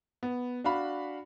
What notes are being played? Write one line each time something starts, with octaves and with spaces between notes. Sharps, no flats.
B3
D4 F#4 F5 B5